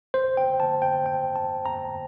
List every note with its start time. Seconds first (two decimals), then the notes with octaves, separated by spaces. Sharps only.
0.14 C5
0.37 G5
0.60 A5
0.82 G5
1.06 G5
1.36 A5
1.66 A#5